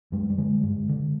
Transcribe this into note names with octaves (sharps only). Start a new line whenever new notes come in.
F#2 G#3
G3
D3 G#3
G2
D3